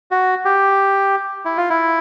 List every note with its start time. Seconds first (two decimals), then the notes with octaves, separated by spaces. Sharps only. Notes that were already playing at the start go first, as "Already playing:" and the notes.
0.11 F#4
0.45 G4
1.45 E4
1.57 F4
1.70 E4